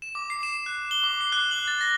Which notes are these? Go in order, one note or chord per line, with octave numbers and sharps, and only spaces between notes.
E7
D6
C7
E7
F#6
G7
D6
C7
F#6
F#7
A6
A#6